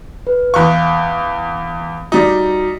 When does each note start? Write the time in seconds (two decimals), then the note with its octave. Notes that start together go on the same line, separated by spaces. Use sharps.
0.27 B4
0.54 E2 F5 C#6 F#6
2.12 G3 D#4 F#4